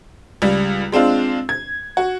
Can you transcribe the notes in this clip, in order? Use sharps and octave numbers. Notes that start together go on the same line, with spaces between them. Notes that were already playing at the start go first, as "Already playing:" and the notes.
C#2 G3
G#3 C4 D4 F4
G#6
F#4